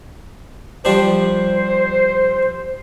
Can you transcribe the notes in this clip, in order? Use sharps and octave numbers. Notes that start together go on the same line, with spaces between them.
F3 G3 D4 C5